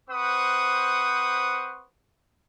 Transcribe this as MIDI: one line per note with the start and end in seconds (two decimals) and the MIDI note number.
0.10 1.85 60
0.10 1.85 71
0.10 1.85 72
0.10 1.85 78
0.10 1.85 85
0.10 1.85 87